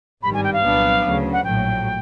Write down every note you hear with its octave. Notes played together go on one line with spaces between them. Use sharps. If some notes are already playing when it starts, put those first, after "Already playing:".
G#1 G2 D#3 G3 B5
G#5
G5
F5
C2 A#2 F#3 B3 D4
D2 C#3 F#3
F#5
A#1 A2 F#3 G5